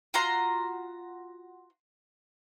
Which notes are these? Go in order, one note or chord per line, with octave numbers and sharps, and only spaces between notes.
F4 F#4 A#5 C6